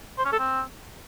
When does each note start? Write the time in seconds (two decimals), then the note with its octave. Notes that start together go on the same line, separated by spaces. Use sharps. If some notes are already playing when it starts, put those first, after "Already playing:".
0.18 C5
0.25 C#4
0.32 A4
0.39 C4